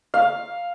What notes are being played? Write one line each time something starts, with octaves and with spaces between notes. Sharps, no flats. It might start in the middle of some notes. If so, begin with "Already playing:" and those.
F5